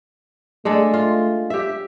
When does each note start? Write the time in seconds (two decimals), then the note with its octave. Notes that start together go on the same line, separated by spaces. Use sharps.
0.65 G#3 A3 D4 A4
0.94 F4
1.50 G4 E5